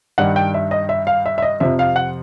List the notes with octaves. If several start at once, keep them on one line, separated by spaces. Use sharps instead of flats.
G2 D#3 G3 F#5
G5
E5
D#5
E5
F5
E5
E5
D#5
F2 C3 F3 E5
F5
F#5